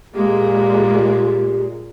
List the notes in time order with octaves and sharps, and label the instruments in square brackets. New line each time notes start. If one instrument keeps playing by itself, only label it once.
[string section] A#2 [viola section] G#3 [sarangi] A#3 [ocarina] G4